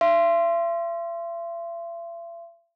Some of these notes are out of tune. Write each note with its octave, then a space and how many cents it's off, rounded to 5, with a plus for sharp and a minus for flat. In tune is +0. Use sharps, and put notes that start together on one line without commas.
E5 +45 C6 +0